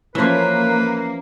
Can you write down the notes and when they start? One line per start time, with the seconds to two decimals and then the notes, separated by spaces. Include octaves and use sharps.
0.15 E3 F3 A#3 C#4 B4 C6